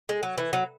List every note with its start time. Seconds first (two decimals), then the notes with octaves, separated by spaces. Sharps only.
0.09 G#3
0.23 F#3
0.38 E3
0.53 F#3